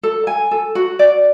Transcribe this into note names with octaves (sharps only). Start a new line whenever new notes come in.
A4
G#5
A4
F#4
D5